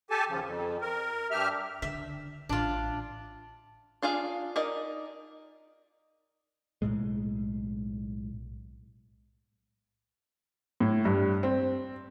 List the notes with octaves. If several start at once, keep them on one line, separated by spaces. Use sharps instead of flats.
G4 A4 G#5 A5
D#2 C#3 F3
F2
A#4
G2 G4 E5 F6
D3 E5
A1 D4 F4
D4 F4 G#4 F5
D#4 A#4 D5 D#5
B1 E2 A2 G#3
A2
G2
C4